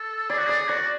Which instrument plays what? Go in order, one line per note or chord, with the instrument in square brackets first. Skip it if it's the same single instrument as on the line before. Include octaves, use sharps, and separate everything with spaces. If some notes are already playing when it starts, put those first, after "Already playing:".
Already playing: [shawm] A4
[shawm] G#4 [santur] D5
[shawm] F#4
[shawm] G#4 [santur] D5
[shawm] F#4 [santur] D5